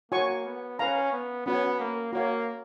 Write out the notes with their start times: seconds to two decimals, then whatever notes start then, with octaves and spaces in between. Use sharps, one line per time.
0.12 A#3 F#4 C#5 G#5 C#6
0.45 B3
0.79 C#4 B4 F5 A#5
1.12 B3
1.46 B3 C#4 F#4 C#5
1.79 A#3
2.13 A#3 F#4 C#5 F5